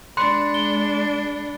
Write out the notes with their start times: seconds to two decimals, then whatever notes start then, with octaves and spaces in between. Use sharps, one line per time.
0.17 G#3 D4 B5 C6 F#6 C#7
0.54 G7